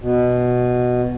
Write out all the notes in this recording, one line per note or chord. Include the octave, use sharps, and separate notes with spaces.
B2